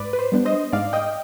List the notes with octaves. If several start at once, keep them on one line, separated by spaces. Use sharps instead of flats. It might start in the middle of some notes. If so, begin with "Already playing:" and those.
Already playing: G#2 B4 D5
B4
C5
G3 B3 D4
C5 D#5
G#2 D5 F5
D#5 G5